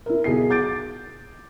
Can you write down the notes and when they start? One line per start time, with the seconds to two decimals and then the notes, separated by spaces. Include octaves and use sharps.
0.06 E4 A#4
0.24 B1 G#4 C7
0.50 D6 G6 A6 D7